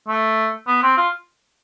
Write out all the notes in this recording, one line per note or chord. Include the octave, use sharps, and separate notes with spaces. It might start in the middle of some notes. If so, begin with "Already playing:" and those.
A3
B3
C4
F4